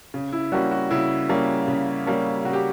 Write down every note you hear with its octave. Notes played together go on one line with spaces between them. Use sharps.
C#3
E4
G3 A#3 C#4 F#4
F#4
C#3 E4
G3 A#3 C#4
C#3
G3 A#3 C#4
C#3 F#4
G4